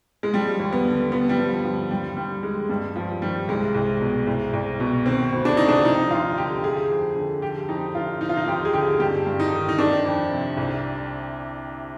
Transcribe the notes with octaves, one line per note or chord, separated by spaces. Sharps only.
G#3
F3 G3
D#2
B3
D3
F3 B3
G3
G2 F3
D3 F3
D#2 G3
D#2 G3
D#3 G#3
G2 G3
G2 F3
D#3 G3
C2 G#3
C2
B2
C2
C2
B2
D#3 C4
D2
D4
C3 D#4
D4
F3 D#4
D#2 F4
D3 G4
F3 G#4
F2
D3
F3 G4
F2 D#4
D3 F4
F3 D#4
F4
D#4
D#2 G4
G#4
D3 G4
G2 G4
G2
D#4
D#3
D#4
D#3 D4
F2
C3
C2